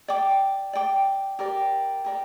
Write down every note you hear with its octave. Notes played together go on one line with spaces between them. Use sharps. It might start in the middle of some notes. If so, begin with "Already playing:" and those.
D5 G5 D6
D5 G5 D6
G4 A#4 D5
G4 A#4 D5